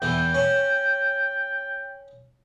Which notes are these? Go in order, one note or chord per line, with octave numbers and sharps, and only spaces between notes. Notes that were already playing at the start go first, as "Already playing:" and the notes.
E2 E3 G5
C#4